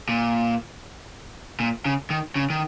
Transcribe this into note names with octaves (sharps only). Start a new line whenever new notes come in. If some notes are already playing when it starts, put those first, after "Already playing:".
A#2
A#2
C#3
D#3
C#3
D#3